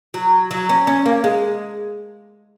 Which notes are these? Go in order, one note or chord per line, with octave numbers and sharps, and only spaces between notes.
F#3
F#3
C#4
C#4
A#3
G#3